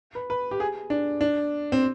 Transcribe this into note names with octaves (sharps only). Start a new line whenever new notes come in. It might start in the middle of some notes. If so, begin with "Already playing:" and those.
B4
B4
G4
G#4
D4
D4
C4